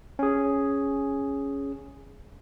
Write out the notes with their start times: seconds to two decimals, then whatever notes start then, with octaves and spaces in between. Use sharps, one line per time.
0.19 C#4 G#4